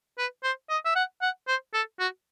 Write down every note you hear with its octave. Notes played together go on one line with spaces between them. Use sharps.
B4
C5
D#5
E5
F#5
F#5
C5
A4
F#4